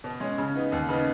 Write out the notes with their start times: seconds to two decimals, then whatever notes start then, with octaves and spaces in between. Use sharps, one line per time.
0.04 B2
0.20 G#3 C#4
0.38 C#3
0.54 B3 D#4
0.72 D#2
0.89 C#3 B3 D#4